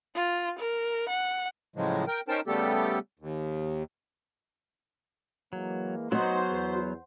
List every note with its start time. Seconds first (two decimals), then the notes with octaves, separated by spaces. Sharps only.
0.15 F4
0.59 A#4
1.09 F#5
1.76 A2 C#3 F3 F#3 G#3
2.07 A#4 G5
2.28 C#4 D#4 A#4 C5 G5 A5
2.47 C#3 G3 A3 B3 G4 A4
3.19 D#2
5.53 E3 F#3 G#3 A#3
6.12 F#3 B3 D#4 F#4 C5
6.49 E2